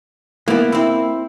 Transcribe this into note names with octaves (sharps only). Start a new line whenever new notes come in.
E3 A#3 B3
C4 E4